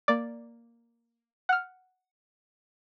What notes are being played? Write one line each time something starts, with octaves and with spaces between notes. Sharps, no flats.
A#3 D5
F#5 F6